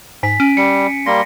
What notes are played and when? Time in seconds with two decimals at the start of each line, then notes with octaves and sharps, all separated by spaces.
0.23 G#2 G#5 B6
0.40 C#4 D7 D#7
0.57 G3 C#7
1.06 G3 A#3 C6 A#6